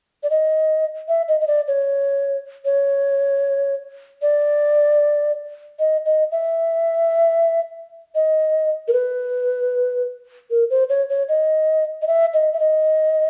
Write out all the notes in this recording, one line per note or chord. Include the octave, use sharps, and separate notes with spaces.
D5
D#5
E5
D#5
D#5
D5
C#5
C#5
D5
D#5
D#5
E5
D#5
A#4
B4
A#4
C5
C#5
C#5
D#5
D#5
E5
D#5
E5
D#5